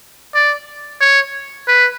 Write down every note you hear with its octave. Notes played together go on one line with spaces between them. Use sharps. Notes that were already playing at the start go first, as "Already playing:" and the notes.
D5
C#5
B4